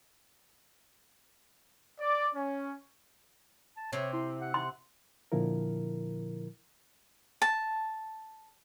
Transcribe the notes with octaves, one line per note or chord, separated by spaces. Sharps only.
D5
C#4
A5
C3 C#5
E4 C6
F#5
C6
A#2 D3 F3 E4 A#4
A5